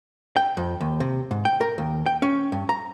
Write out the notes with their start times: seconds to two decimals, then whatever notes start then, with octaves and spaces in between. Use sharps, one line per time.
0.36 G5
0.57 F2
0.81 D#2
1.00 C3
1.31 G#2
1.45 G5
1.61 A#4
1.78 D#2
2.06 G5
2.22 C#4
2.52 G2
2.69 A#5